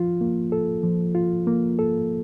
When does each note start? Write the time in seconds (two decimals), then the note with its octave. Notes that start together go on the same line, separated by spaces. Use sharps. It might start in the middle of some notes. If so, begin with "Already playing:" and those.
Already playing: F3 F4
0.21 A#3
0.52 A4
0.83 F3
1.15 F4
1.47 A#3
1.79 A4